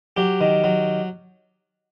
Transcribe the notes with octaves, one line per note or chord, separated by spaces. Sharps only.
F#3 G4
D#3
F#3